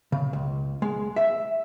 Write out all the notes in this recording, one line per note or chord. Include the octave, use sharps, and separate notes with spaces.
C#3
C#2
G#3
E5